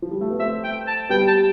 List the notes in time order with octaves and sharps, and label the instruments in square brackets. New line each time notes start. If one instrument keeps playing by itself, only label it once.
[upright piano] F3
G3
A3
B3
[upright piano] A3 C4 [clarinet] E5
[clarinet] G5
A5
[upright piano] G3 B3 [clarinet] G5
[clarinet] A5